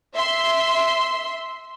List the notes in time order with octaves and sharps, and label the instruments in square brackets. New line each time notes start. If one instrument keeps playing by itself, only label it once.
[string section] E5 C6